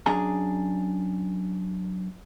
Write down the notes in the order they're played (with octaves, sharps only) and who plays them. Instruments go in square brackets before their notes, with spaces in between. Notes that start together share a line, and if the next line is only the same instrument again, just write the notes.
[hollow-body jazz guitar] F#2 D4 G#4 A#5